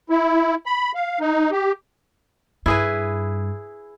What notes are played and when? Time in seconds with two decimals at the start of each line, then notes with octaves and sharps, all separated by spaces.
0.10 E4
0.66 B5
0.95 F5
1.20 D#4
1.52 G4
2.66 G2 E4 G#4 B4